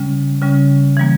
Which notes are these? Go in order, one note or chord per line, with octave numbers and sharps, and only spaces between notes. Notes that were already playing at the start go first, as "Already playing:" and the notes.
Already playing: C#3 G3 C#4
C#3 G3 C#4
E3 G3 A#3